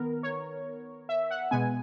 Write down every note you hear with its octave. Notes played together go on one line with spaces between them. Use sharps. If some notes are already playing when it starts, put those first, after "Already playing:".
Already playing: D#3 B3 A#4
C#5
E5
F#5
B2 G#3 B3 G#5